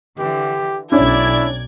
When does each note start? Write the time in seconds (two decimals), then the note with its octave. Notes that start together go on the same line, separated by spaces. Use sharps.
0.19 D3 E3 G4
0.92 B1 C#4 D4 E4 D5 G#6